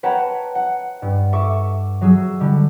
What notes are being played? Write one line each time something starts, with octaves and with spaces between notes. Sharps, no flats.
B4 C#5 F#5 G5 A5 A#5
F#5
G2
A4 E5 C#6 D6
F#3 G#4 E6
D3 G3